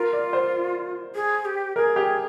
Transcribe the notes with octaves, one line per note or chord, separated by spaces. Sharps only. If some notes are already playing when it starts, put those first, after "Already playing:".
Already playing: F4 A#4
D5
C5
G#4
G4
G#4 A#4
G4